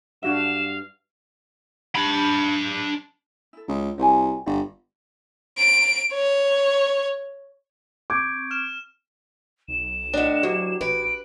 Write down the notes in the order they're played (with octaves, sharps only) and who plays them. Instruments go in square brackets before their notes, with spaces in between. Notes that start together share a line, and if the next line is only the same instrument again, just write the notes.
[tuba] G2 [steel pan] D4 F#4 E5 [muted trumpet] F5 [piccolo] E7
[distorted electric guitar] D4 B5
[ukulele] E4 A4
[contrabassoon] C#2
[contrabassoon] C2 [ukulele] F#4 G5 G#5
[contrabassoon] G1 [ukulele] D5 D#5
[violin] D7
C#5
[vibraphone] C4 C#6 [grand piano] D6 [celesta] G6 G#6 D7
[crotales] F6 E7
[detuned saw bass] B1 [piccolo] E7
[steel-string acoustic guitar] A2 D4 [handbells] D#5 F#5
[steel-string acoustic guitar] D2 [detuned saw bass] F#3 [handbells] F#4 G4
[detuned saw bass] A1 [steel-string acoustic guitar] B4 [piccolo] D7